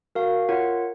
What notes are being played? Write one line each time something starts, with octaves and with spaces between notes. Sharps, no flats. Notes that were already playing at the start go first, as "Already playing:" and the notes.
F#4 A#4 F5
F4 A#4 C#5 F#5